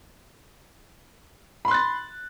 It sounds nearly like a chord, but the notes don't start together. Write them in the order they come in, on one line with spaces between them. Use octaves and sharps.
B5 C6 F#6 A6